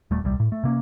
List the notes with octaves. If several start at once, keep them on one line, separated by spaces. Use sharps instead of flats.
D#1 G3 A3
D#1 C2 G3
A2
A3
C3 A#3 C#4